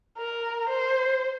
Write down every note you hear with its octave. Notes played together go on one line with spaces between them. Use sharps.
A#4
C5